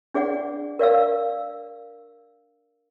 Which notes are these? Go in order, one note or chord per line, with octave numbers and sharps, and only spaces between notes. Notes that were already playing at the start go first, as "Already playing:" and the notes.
D4 G#4 D5 F#5
A#4 D5 F5 E6